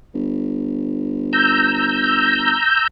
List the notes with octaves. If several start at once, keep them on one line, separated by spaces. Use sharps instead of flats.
G1
A#5 E6 G6